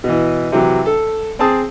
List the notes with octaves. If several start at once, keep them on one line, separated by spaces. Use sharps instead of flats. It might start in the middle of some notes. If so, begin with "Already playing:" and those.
B2 E3
C3 E3 F#3
A4
C4 G#4 A5 D#6